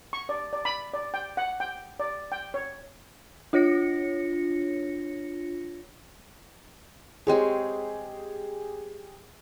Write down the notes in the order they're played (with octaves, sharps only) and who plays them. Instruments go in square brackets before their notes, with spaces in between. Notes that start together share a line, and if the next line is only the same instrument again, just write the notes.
[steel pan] C#6
D5
D5
B5
D5
G5
F#5
G5
D5
G5
C#5
[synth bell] D4 F4 C#5 A#6 C#7
[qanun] G#3 C4 C#5 [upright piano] G4 G#4